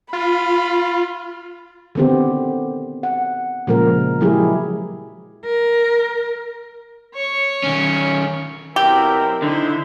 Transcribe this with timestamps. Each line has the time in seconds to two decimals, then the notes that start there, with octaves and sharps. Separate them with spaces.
0.13 F4 B5
1.95 D3 D#3 B3 C4 G4
3.03 F#5
3.67 A#2 C#3 F3 G#3 A#4
4.20 F3 F#3 G#3 E4 G4 G#4
5.45 A#4
7.15 C#5 C#6
7.63 D#3 C#4
8.76 B2 F#3 C4 E4 G4 A#4
9.42 D3 D#4 E4 C5